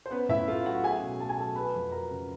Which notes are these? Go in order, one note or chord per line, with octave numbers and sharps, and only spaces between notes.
C5
B3 C#4 B4
A2 E4 E5
A3 F4 F5
F#3 F#4 F#5
C#4 G#4 G#5
B2
A3 A5
G#5
F#3 A4 A5
A3 B4 B5
F2
F#3 A#4 A#5
C#3